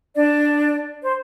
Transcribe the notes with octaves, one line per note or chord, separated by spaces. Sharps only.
D4 D5
C5